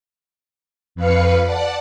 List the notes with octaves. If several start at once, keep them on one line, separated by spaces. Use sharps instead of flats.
F2 B4 F5 C#7
D5 F#5 A5